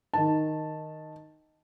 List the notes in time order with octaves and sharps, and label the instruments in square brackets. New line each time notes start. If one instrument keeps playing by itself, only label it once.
[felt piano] D#3 A5